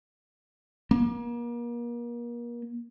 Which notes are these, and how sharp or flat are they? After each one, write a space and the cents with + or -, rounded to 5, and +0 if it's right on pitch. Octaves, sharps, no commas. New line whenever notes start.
A#3 +35